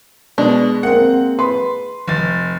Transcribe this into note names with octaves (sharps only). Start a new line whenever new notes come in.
B2 G#3 D4
A#3 C4 F#5
B4 C6
F1 A6